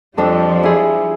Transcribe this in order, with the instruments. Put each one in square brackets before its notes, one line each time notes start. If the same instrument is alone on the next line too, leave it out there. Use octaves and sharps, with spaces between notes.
[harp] F2 D4 A4 [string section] F3 G3
[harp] E4 G#4